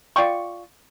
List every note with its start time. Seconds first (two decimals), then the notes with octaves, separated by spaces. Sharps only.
0.16 F4 D5 G5 C#6